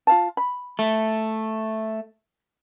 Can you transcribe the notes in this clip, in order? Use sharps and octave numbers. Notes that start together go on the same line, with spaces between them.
F4 F5 A5
B5
A3